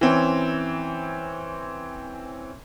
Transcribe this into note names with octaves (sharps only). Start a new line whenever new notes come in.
E3 C4 C#4